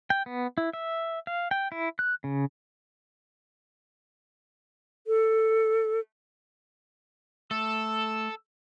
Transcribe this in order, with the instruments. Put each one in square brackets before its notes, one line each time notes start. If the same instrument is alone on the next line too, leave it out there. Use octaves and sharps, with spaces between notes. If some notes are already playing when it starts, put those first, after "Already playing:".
[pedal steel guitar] G5
B3
E4
E5
F5
G5
E4
F#6
C#3
[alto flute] A4
[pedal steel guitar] A3 [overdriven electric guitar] A4 [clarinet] E6